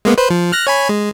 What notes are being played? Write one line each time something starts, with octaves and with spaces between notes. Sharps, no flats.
G#3 A#3 B3
B4 C5
F3
F6 F#6 A#6
C#5 G#5 B5
G#3